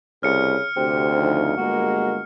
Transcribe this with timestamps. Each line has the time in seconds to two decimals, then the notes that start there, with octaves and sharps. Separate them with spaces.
0.23 C2 C#3 F6 C#7
0.77 D2 C3 C4 G4
1.17 F2 C#3 D#4
1.57 G1 G#3 A#3 F#4 A#4